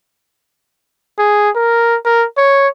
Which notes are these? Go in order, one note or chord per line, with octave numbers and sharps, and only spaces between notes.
G#4
A#4
A#4
C#5